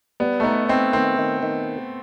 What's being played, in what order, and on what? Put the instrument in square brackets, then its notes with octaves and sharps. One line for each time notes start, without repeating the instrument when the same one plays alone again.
[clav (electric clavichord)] G3 [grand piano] B3
[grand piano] A3
[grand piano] B3 [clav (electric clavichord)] D#4
[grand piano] C4 [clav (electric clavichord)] D#4
[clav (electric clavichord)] D#3 [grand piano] C4
[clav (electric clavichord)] D#3
D#3